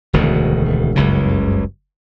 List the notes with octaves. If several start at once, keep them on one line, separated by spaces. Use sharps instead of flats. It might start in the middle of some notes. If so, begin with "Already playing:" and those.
E1 D2 B2 D#3
F#1 C#2 G2 C#3